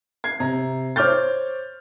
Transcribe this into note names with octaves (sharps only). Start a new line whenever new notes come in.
G#6 C7
C3 A#5
C5 C#5 D6 F6 G6 A6